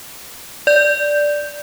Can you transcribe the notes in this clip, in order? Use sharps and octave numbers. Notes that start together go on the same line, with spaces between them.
D5 G6